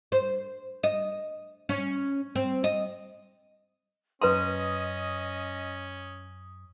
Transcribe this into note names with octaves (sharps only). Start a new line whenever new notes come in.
C5
D#5
C#4
C4
D#5
F#2 C#4 B4 D#5 A#5 C6 D#6